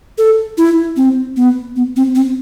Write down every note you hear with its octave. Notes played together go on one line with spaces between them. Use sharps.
A4
E4
C4
B3
B3
C4
C4